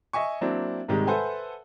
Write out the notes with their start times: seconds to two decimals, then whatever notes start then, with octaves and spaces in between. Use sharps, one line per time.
0.13 D#5 E5 G#5 C#6
0.41 F#3 A#3 C4 D4 E4
0.88 G#2 C3 D#3 G3 G#3
1.07 A4 B4 C5 E5 F#5 G#5